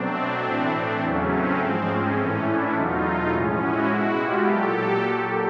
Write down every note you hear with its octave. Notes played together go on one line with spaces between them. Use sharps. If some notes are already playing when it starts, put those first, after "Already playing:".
Already playing: B2 F#3 A3 C4 D4
C4 D4
A2 E3 A3
C4 D4
E2 C#3 F#3 A3 C#4
C4
G#2 F3 G#3
C#4
A2 E3 A3
D4 E4
E2 B2 F#3 A3 D#4 F4
D#4 F4
A2 F3 G#3 C#4
E4 F#4
G#3
B2
F4 G4
A#2 F#3 G4 A4